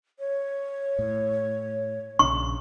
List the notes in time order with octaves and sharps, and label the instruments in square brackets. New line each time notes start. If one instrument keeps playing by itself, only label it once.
[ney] C#5
[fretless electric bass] A2
[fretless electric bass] A#1 C#3 D4 [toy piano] C#6